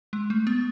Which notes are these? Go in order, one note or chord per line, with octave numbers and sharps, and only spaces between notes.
G#3
A3
B3